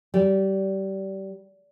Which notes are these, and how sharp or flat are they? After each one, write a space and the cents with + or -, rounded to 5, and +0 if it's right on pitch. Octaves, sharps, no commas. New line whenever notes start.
G3 -25